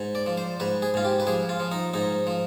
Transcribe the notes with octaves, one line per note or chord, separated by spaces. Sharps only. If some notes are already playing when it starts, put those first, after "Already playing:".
Already playing: G#2
D5
F3
C5
G#2 B4
G#4
G#2 F4
G4
B4
F3 G#4
F4
F3
D#4
G#2 D#4
F3